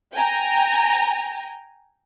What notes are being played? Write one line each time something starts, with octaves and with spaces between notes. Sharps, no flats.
G5 G#5 A#5